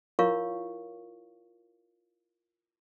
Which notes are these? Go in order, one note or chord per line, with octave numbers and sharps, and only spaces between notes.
E4 F4 A#4 C#5 F5 C#6